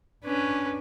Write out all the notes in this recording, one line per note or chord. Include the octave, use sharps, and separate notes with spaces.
C#4 D4 B4